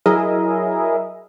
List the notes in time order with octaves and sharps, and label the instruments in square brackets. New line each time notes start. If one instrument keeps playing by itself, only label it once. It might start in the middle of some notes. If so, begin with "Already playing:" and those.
[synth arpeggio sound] F#3 E4 G#4 A#4 D#5 E5